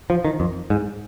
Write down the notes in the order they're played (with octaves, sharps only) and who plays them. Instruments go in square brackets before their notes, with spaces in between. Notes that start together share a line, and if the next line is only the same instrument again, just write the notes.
[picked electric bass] F3
D#3
F2
G#2